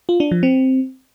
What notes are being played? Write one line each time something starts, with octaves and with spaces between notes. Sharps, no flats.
F4
D4
F3
C4